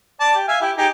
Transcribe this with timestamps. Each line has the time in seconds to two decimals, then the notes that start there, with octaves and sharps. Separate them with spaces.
0.20 D5 A5
0.35 G4
0.48 E5 F5 G#5
0.61 E4 G4
0.77 D#4 G4 G#4